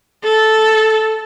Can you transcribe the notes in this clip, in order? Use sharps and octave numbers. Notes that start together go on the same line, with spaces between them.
A4